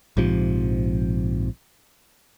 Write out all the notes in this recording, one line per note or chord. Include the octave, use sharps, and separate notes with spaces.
A#1 G#2 C3 F3